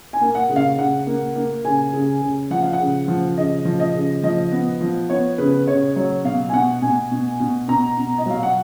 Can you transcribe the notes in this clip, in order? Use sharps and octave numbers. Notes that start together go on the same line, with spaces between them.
G#5
A#3
F#5
C#3
F5
C#3 F#5
A#3
A#3
C#3 G#5
C#3
C#3
F3 F#5
F5
F#5
C#3
F3
C#3 D#5
F3
D#5
C#3
F3 D#5
B3
F3
B3 C#5
C#3 B4
C#3 C#5
F#3 C#5
B2 F5
G#5
B2 F#5
B2 G#5
B2
B2
B2 A#5
B2
D#5
F#3 F5
F#5